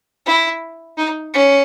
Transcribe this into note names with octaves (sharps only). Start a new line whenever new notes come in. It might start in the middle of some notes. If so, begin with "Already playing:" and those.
E4
D#4
C#4